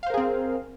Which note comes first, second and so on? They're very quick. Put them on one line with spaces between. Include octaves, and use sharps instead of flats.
F5 C5 A#4 G#4 C4